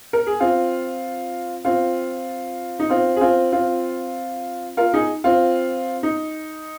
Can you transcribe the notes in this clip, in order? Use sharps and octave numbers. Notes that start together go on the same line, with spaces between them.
A#4
G#4
C4 F4
C4 F4
D#4
C4 F4
G#4
C4 F4
C4 F4
F4 A#4
D#4 G#4
C4 F4
D#4